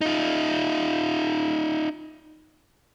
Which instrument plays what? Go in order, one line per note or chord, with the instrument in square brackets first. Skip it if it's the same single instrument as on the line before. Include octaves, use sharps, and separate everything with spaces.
[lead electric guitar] D#4 F4